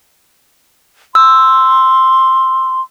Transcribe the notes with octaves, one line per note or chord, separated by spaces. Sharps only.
C6 E6